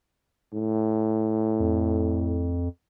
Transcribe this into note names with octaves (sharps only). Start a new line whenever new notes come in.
A2
F2